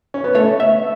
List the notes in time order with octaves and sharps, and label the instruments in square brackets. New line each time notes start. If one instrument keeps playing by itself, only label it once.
[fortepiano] C#4
B3
[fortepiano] A3 [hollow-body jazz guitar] C#5
[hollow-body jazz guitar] E5